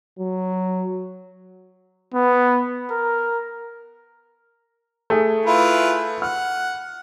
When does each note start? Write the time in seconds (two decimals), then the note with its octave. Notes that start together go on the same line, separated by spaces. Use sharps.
0.19 F#3
2.14 B3
2.91 A#4
5.10 A3 G#4
5.46 E4 F4 B4
6.22 F#5 F6